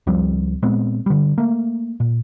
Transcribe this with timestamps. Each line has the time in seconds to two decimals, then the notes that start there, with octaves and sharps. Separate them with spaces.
0.07 C#2 F3 G3 C4
0.62 A#2 G#3 B3 C4
1.06 D3 G3
1.38 A3 A#3
2.00 A#2